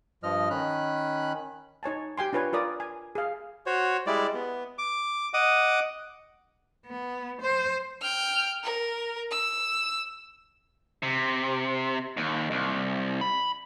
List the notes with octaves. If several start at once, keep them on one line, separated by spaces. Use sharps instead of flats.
G2 F3 D#5 F6
D#3 C#4 B5 F#6
D#4 C#5 G#5 A5
G4 G5 G#5 C6
D4 F4 B4 C#5 G#5
F4 A#4 D5 D#6
G#5
G#4 F5
F#4 C5 C#5
G3 G#3 E4 D5
B3
D6
D#5 F#5 D6 D#6
B3
C5
G5 F6
A#4
E6
C3
D#2
C2
B5